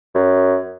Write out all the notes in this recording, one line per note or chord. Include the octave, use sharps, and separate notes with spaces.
F#2